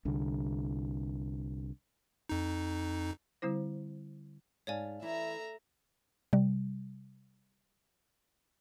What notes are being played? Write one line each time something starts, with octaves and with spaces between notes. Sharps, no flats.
C2 D3
F2 D#4
D3 G3 C4 E4 C5
G#2 C#5 D5 F5 G#5 A5
E3 A3 E4 E5 A#5
C3 G3